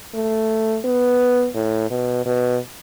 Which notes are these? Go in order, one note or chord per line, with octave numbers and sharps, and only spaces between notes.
A3
B3
A2
B2
B2